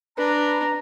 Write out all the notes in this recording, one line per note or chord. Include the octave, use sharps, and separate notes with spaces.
D4 B4 A#5